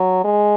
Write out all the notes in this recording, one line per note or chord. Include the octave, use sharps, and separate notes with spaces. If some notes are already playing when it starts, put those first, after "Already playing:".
Already playing: F#3
G#3